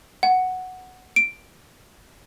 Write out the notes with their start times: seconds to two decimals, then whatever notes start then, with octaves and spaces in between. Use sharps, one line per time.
0.23 F#5
1.16 D7